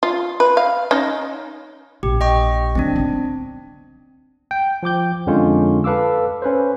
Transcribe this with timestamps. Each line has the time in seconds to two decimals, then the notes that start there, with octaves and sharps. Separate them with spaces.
0.03 F4
0.40 B4
0.57 F5
0.91 C#4 D#4
2.03 A#1 G4
2.21 D#5 G5 C#6
2.75 D3 F#3 C4 D4
2.96 B3 D#4
4.51 G5
4.83 F3 G5 D6 G6
5.27 F2 D3 G#3 C#4 F4 C#5
5.84 A4 B4 F5 D6 E6
6.42 C#4 B4 C5